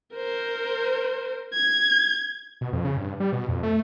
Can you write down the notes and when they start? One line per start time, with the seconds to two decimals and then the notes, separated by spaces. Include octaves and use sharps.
0.15 A#4 C5
1.53 G#6
2.61 B2
2.73 F2
2.85 C#3
2.97 G2
3.20 G3
3.32 B2
3.48 F2
3.63 A3